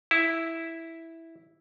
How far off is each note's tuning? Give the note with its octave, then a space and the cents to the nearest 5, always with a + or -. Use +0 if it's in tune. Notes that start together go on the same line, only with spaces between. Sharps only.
E4 -5